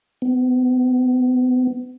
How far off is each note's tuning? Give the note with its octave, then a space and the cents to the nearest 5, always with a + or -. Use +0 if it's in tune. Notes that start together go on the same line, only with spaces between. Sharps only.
B3 +35